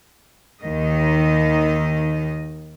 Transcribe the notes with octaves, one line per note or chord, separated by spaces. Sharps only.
D#2 D#3 D#5